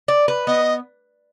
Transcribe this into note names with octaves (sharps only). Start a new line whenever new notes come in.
D5
B4
B3 D#5